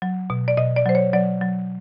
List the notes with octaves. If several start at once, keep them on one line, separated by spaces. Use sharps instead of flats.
F#3
B2
D5
B2 D#5
D5
F#3 C5
C#5
F#3 D5
F#3